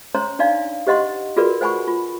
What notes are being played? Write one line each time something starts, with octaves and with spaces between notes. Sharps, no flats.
C#4 C5 C#5 A#5 C6
D4 D#4 D5 F5
G4 C5 D#5 F#5 C6
F4 F#4 G#4 A#4 B4 D5
C5 F#5 G#5 B5 C#6
F4